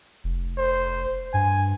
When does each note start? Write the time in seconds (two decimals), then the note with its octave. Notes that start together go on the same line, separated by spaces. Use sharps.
0.24 F1
0.58 C5
1.34 G2 G#5